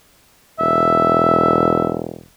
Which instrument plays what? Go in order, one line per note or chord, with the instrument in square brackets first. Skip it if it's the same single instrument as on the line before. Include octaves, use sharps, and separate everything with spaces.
[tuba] E1 [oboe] E5